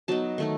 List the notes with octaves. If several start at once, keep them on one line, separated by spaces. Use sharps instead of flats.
F#3 B3 D#4 A5
D#3 A3 D#4